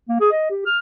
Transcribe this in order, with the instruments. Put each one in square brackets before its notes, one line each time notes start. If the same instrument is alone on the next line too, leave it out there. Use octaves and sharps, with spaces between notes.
[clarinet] A#3
G#4
D#5
G4
F6